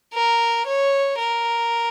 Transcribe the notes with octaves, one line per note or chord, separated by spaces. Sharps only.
A#4
C#5
A#4